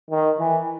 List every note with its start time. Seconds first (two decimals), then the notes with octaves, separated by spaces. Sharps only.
0.11 D#3
0.40 E3